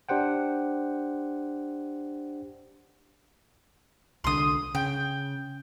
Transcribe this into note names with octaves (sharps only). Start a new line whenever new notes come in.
D4 G4 C5 F#5 G5
C2 D3 C6 D#6
C#3 G5